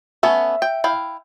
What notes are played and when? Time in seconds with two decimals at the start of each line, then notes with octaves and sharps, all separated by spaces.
0.23 A3 B3 C#4 E5
0.62 G5
0.84 E4 F5 G5